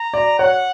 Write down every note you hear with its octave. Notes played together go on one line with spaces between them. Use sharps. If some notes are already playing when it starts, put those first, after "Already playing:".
Already playing: A#5
D5
C#5 F#5